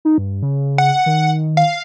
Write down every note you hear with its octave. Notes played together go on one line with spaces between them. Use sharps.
D#4
G2
C#3
F#5
D#3
F5